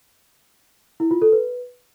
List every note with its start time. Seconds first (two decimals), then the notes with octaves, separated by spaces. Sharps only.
1.00 E4
1.11 F4
1.22 A4
1.32 B4